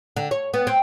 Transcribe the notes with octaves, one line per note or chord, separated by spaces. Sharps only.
D3
C#5
B3
C4